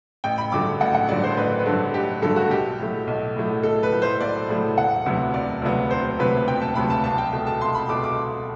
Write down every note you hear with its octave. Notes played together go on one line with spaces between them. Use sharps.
A1 G5
B5
G2 D3 F#3 A3 D6
A1 F#5
F#5
G2 D3 F#3 A3 D5
C5
A1 B4
B4
G2 D3 F#3 A3 A4
A1 G4
G2 D3 F#3 A3 A4
F#4
B1 G4
A2 F#3 A3
B1
A2 F#3 A3
B1 A4
B4
A2 F#3 A3
C5
B1 D5
A2 F#3 A3
E1 F#5
D2 C3 F#3 B3
E1 D5
D2 C3 F#3 B3
E1 C5
D2 C3 F#3 B3 B4
E1 G5
A5
D2 C3 F#3 B3 B5
A5
C2 A5
G5
B2 A3
A5
C2 C6
B5
B2 A3 D6
D6